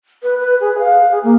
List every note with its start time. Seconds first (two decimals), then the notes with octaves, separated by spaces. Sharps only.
0.23 B4
0.39 B4
0.60 G#4
0.79 F5
1.11 G#4
1.24 A#3